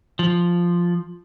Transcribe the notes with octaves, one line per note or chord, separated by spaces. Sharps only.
F3